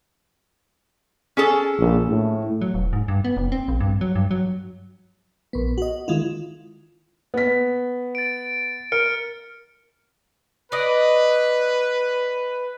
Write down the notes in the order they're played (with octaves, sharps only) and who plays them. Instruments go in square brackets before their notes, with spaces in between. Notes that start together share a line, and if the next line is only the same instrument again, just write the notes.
[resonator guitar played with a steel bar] C#4 G#4 A4
[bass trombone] A#1
A2
[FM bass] F#3
E1
G#2
G2
B3
F1
C4
A#1
G2
F#3
G2
F#3
[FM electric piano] A#1 B3
F#4 D#5
D#3 G#3 E4 F4
[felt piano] B3 B6
[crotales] A6 D7
[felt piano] A#4 [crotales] F6 C#7 D7
[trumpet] B4 [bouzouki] D5 D#5